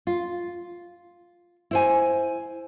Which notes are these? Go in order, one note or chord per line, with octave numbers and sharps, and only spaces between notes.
F4
E4 C5 G#5